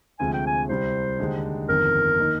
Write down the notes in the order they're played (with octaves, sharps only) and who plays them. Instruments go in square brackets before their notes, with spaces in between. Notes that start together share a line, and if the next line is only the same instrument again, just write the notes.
[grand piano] D2 C3 F3 G#3 [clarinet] G#5
[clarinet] G5
G#5
[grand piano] C2 C3 G3 [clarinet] C5
[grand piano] D#2 D3 G#3 D#4 G4
[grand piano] G1 F2 D#3 [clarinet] A#4
[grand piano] D#3 A#3 D#4